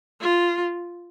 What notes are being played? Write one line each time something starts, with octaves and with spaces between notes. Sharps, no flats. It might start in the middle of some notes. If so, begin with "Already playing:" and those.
F4